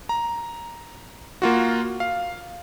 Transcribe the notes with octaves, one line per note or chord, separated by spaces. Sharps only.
A#5
A#3 F4 F#4
F5